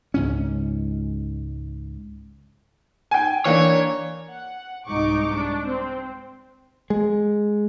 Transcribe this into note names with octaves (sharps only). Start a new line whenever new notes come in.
C#2 G#2 C#4
G5 G#5
E3 A#3 D4 C#5
F#5
C2 G#2 D#4 C#6 D6
D4
C4
G#3